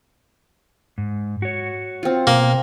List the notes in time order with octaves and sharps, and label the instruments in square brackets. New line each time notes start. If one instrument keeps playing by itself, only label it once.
[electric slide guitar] G#2
F#4 C#5
[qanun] C4 F4
[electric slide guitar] B2 [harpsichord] A#3